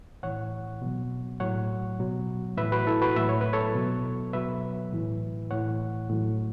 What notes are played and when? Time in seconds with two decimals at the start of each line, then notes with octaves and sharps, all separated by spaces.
0.23 A2 E3 C#5 F#5
0.82 B2 F#3
1.40 A2 F#3 C#5 F#5
1.99 B2 F#3
2.57 A2 E3 B4 E5
2.72 F#4 B4
2.87 E4 A4
3.02 F#4 B4
3.16 A2 F#3 E5
3.29 C#5
3.41 B4
3.53 A4 C#5
3.75 B2 F#3
4.33 B2 F#3 B4 E5
4.92 A2 E3
5.51 A2 E3 C#5 F#5
6.10 A2 F#3